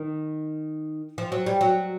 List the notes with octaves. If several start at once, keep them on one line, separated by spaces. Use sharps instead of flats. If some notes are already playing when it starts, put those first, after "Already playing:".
Already playing: D#3
F3
F#3
G3
F#3